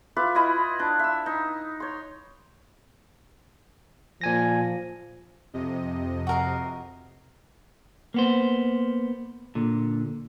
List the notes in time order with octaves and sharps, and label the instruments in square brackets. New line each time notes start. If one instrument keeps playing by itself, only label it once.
[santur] F4 B4 E5 D6
E4 F4 D#5 B5
D4
E5 E6
D#4
C#5 C6
[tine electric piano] A#2 G#5 A#6 [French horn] F3
[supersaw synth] F2 C3 D#5
[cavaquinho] F#4 A#4 F5
[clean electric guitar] A#3 B3 C5
A#2 D3